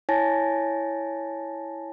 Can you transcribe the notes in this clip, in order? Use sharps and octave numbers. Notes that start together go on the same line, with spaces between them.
E4 C#5 G#5 A5 A6 A#6